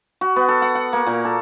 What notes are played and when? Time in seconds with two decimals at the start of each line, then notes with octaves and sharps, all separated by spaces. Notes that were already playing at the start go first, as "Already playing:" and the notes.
0.21 F#4
0.36 B3
0.49 A4
0.62 F#5
0.75 F#5
0.93 A#3
1.07 A#2
1.25 A4